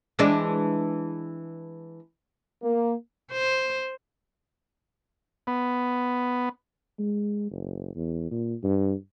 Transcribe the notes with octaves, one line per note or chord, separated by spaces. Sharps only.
E3 G#3 D4
A#3
C5
B3
G#3
F#1
E2
A#2
G2